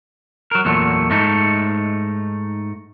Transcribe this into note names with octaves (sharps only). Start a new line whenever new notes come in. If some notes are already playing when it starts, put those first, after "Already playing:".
F#3 A#4
E2 A#2 F#3 A3
G#2 A3 D#4